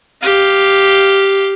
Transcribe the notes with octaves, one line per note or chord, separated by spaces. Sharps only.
G4 F5